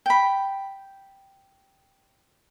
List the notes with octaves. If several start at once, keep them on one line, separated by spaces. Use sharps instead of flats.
G5 B5